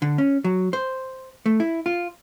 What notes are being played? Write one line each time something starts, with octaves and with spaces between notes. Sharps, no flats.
D3
C#4
F#3
C5
A3
E4
F4